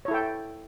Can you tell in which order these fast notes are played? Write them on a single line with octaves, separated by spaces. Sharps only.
C#5 E4 A4 G5